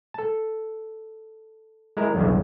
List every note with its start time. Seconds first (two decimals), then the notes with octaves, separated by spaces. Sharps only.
0.14 A4 A5
1.97 G#3 E4 A#4
2.15 B1 E2 G2 C#3